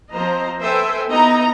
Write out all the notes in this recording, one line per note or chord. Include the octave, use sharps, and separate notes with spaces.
F3 C4 C5 D#5 A#5
A4 B4 C5 E5 G5 G#5
B3 D#4 E4 D#5 A#5